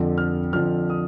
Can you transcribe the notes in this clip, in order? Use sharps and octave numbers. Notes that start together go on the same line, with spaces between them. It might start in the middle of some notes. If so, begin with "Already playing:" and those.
Already playing: F2 D3 F3
F6
F2 D3 F3 F6
D#6